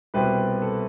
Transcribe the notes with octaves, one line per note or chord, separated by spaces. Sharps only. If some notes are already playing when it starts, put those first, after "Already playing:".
C2 B2 G3 C4 G4 B4
A4